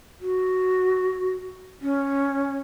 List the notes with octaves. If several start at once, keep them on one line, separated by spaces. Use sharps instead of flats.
F#4
C#4